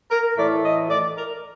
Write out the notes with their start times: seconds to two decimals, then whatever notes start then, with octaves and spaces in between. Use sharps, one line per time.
0.11 A#4
0.36 A2 E3 A3 D5
0.63 D#5
0.89 D5
1.16 A#4